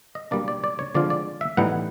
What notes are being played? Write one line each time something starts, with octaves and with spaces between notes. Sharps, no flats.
D#5
B2 G3 A#3 D4 D5
D5
D5
C#5
D3 F3 G#3 C4 F4 D5
D5
E5
A2 E3 G3 B3 D#4 F#5